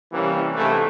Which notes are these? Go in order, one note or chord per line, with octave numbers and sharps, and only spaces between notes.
C3 E3 G3 A#3 C#4
G#2 C3 E3 A3